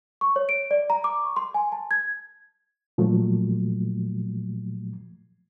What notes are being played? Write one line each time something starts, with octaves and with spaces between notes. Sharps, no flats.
C#6
C#5
D7
D5
A#5
D6
C#6
C6
G#5
A5
G#6
A#2 F3 F#3 A3